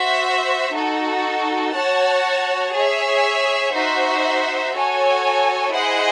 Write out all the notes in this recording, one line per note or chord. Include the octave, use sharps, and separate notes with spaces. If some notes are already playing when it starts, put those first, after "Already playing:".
Already playing: F#4 C5 E5
D#4 F#4 A4
F#4 C#5 F#5 A5
G#4 C#5 E5
D#4 F#4 C5 E5
F#4 A4 C#5 G#5
E4 G#4 C5 D#5 F#5